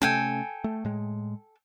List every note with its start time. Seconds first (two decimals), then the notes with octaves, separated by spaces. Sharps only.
0.02 C3 A3 C#4 A4 G5 G#5
0.64 A3
0.85 A2 G#3